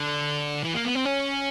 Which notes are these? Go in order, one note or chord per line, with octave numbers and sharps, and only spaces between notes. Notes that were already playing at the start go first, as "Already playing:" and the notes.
Already playing: D3
E3
A#3
B3
C4
C#4